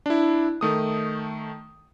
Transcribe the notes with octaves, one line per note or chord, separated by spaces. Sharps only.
D4 E4
D#3 A3 D#6